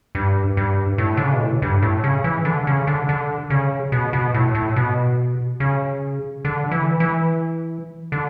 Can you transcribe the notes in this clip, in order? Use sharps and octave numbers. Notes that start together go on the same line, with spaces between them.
G2
G2
A2
D3
C#3
B2
A2
G2
A2
C#3
E3
D3
C#3
D3
D3
C#3
B2
B2
A2
A2
B2
C#3
D3
E3
E3
D3